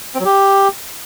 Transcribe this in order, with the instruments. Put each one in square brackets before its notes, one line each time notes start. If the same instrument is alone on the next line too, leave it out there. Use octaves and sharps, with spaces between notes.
[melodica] C4
F#3
G4